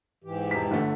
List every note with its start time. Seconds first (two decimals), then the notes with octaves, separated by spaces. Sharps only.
0.24 G#2 E3 G4
0.51 E1 B6
0.71 G1 D3 A3